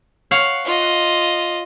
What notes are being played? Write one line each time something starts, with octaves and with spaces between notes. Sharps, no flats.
C#5 F5 F#5
F4 D#5